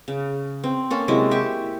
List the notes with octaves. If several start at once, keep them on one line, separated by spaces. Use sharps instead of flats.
C#3
C4
A#3 C#4 A4
C3 F#3 G#3 E4
G4 E5 C#6